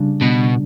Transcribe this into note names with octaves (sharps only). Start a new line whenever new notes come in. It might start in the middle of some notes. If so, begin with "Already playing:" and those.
Already playing: C#3 G3 D4
B2